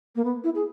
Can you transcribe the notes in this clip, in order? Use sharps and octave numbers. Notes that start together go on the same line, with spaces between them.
A#3
B3
E4
G#4